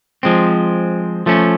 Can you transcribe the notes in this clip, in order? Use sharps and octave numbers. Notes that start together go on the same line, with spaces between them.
F3 G#3 C4
F3 A3 C#4